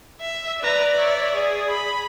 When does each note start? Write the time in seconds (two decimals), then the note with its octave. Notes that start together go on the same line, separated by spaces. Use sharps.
0.21 E5
0.62 B4 D5 A#5
0.96 C#5 E5
1.34 G#4
1.70 B5